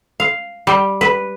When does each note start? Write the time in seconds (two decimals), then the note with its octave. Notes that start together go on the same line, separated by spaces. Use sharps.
0.20 F5
0.67 G3
1.01 B4